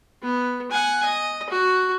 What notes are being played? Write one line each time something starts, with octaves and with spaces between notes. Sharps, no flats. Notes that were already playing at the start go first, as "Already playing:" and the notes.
B3
F#5 G#5
D#5
F#4